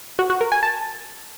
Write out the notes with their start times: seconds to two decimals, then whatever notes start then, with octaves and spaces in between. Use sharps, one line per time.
0.19 F#4
0.30 F#4
0.41 A#4
0.52 G#5
0.63 A5